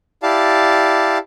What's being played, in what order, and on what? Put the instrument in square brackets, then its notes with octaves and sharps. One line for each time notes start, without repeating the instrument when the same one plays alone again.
[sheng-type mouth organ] E4 G4 D5 F5 A5